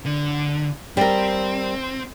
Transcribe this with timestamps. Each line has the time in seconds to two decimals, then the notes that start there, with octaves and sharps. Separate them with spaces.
0.06 D3
0.97 G3 C4 A#4